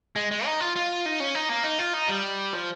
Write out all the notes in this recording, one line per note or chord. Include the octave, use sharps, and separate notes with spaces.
G#3
G#3
D#4
F4
F4
D#4
C#4
D#4
A#3
D#4
F4
D#4
G3
F3